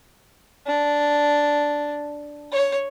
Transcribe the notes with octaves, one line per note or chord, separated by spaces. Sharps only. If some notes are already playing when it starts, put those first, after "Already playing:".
D4
C#5